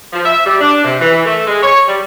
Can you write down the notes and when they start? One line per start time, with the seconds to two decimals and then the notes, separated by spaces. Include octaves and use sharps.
0.13 F3
0.25 E5
0.45 G3
0.61 D4
0.84 C3
0.99 E3
1.25 A3
1.47 G#3
1.63 C#5
1.88 G3